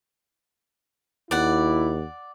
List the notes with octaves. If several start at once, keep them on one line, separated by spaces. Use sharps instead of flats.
D#2 E4 D5 F#5